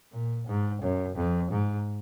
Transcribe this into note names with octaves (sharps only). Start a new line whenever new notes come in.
A#2
G#2
F#2
F2
G#2